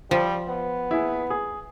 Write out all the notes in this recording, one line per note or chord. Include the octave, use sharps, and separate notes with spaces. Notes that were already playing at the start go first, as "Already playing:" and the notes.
F3 G3
B3
E4 G#4
G#4